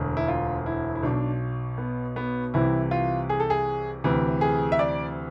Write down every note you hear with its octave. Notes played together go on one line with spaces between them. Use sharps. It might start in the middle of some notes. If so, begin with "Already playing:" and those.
Already playing: E1 D2 D3
E4
F4
E4
E4
B1 B2 D4
B3
B3
C2 C3 E3 E4
F4
G#4
A4
G#4
D2 C3 E3
G#4
E5
D5